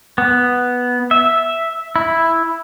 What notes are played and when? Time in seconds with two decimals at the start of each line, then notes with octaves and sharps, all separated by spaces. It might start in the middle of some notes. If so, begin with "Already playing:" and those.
0.18 B3
1.11 E5
1.96 E4